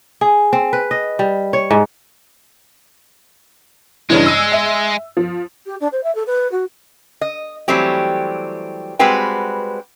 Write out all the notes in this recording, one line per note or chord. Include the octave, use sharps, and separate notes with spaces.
G#4
C4
B4
D#5
G3
C#5
G#2
G2 C#3 E3 G#3
E6 D#7
E5
F3
G4
D4
C5
E5
A4
B4
F#4
D#5
E3 F#3 G3 A3 C4 G4
G3 G#3 C4 F#4 B4 G5